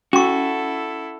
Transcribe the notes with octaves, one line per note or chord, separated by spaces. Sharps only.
C#4 E4 F#4 A4 C#6